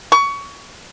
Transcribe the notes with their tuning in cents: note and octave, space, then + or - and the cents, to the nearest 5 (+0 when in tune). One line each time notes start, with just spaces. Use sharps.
C#6 +25